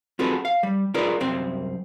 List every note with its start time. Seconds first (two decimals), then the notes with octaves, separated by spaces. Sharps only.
0.19 C4 F4 F#4 G#4 A4 B4
0.45 F5
0.63 G3
0.94 D#4 F4 G#4 A#4 B4 D5
1.20 C2 F#2 C4 G5